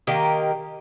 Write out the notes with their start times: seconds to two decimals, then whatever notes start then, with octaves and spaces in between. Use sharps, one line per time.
0.07 D#3 A#3 G4 D#5